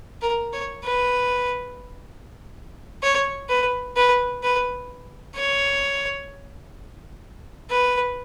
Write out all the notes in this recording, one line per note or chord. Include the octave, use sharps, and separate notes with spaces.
A#4
C#5
B4
C#5
B4
B4
B4
C#5
B4